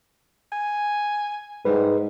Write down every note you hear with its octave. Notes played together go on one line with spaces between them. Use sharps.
G#5
G#2 G3 B4